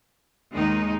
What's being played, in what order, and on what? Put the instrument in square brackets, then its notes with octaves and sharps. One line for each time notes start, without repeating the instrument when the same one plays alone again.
[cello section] D#2 D#3 G#3 D#4